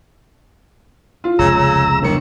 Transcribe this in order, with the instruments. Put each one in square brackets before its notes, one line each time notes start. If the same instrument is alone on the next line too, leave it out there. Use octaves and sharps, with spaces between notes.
[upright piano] F4
[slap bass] F1 C#2 [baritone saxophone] C#3 [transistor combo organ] A#5 E6
[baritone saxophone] C#3
[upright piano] G1 C#7 [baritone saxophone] D#3